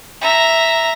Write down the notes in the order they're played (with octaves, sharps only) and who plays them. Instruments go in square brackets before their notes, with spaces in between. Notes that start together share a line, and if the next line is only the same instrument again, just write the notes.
[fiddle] E5 A#5